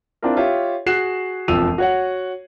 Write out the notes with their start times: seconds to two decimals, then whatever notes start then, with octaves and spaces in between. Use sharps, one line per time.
0.22 C4 D4 E4 F4 A#4
0.37 F4 G4 C#5 E5
0.86 F#4 G#4 F#6 C7 E7
1.48 E1 F2 F3 E6 D#7 F7
1.78 F#4 C#5 F#5